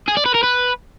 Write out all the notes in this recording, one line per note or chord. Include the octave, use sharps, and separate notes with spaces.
G#4
D5
B4
A#4
B4